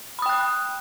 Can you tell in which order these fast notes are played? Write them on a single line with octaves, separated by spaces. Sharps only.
B5 D#6 G5 F#6